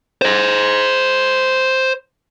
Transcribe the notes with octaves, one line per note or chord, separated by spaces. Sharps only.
C5 D#5